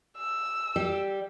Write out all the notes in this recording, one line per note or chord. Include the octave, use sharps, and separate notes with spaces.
E6
G3 G4